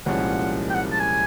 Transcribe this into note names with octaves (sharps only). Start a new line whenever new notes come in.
C2 A#2 F3 G#3 C#4 F#5
G5
F#5
A5
G#5